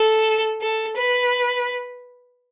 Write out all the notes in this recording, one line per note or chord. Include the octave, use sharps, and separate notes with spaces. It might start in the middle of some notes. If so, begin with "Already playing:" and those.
Already playing: A4
A4
B4